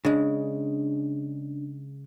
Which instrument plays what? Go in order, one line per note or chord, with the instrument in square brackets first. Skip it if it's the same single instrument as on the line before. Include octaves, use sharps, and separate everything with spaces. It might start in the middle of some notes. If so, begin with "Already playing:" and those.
[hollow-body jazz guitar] C#3 G#3 [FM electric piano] D4